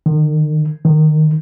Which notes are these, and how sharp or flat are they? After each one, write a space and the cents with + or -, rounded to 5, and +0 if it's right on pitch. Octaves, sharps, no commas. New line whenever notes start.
D#3 -40
D#3 -20